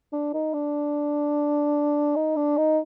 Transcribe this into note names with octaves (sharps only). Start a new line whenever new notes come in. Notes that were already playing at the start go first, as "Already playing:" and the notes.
D4
D#4
D4
D#4
D4
D#4